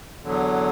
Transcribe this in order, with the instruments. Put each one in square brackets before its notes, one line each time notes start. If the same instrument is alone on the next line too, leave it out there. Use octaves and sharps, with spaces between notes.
[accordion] E2 D3 F#3